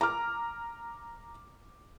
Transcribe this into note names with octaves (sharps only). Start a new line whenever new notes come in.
A#5 D6 F6